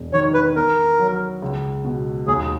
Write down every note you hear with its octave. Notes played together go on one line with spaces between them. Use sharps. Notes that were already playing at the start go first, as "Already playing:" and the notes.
Already playing: E1
D#3 C#5
B4
B3 A#4
F#3
C#2
B2
D#2 G#4